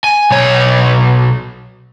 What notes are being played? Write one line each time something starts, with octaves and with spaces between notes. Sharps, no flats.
G#5
B1 C#5